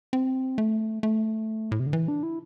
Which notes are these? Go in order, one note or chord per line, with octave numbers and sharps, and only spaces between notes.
C4
A3
A3
A2
C3
D3
E3
D4
E4